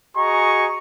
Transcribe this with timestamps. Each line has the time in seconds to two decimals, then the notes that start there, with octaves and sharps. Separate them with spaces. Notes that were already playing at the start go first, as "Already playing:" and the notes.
0.17 F#4 G#4 D#5 G#5 A#5 C#6